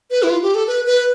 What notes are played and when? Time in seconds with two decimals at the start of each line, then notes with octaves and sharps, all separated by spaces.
0.11 B4
0.23 E4
0.29 F4
0.42 G4
0.55 A4
0.67 B4
0.86 B4